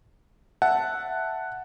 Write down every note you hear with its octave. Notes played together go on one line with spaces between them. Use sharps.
E5 F#5 A5